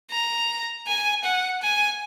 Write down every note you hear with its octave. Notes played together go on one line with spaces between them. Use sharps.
A#5
G#5
F#5
G#5